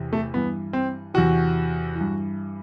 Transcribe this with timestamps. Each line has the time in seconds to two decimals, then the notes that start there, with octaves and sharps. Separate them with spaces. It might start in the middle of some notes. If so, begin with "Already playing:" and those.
Already playing: E2 C3 E3
0.13 A3
0.34 G2 E3 B3
0.73 C4
1.14 E2 C3 E3 F#4
1.95 E3
2.01 G2